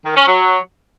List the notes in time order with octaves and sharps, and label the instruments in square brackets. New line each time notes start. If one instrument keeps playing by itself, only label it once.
[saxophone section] D#3
C#4
F#3